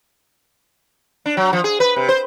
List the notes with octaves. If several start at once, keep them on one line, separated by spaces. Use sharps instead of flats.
D4
F#3
F3
G#4
B4
C3
C5